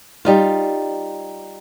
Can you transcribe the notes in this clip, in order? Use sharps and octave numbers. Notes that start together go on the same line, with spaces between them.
G3 D#4 F4